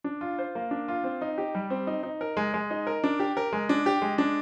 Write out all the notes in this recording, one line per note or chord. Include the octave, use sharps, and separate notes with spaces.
D4
F4
C5
A#3
D4
F4
C4
D#4
G4
G3
C4
D#4
D#4
A#4
G#3
G#3
D#4
A#4
D4
G4
A#4
G#3
D4
G4
G#3
D4